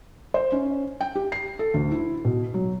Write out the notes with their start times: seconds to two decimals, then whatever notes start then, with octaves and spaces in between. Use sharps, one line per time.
0.34 C5
0.52 C#4
1.01 G5
1.15 G4
1.32 C7
1.59 A4
1.74 D2
1.91 E4
2.25 B2
2.54 F#3